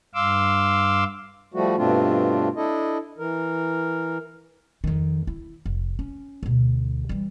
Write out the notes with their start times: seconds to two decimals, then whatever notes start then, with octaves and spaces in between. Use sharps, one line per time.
0.15 G2 F5 C6 D6 E6
1.54 F3 G3 A3 F#4
1.77 G2 B2 A3 C4 D4 F4
2.56 D4 E4 A4 D#5
3.18 E3 A#4
4.84 F2 D#3
5.27 E4
5.66 F1
5.99 C#4
6.43 D2 B2
7.09 E3 G3